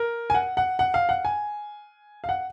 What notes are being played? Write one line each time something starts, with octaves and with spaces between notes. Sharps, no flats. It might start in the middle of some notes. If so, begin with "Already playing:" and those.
Already playing: A#4
G#5
F#5
F#5
F#5
F5
F#5
G#5
F5
F#5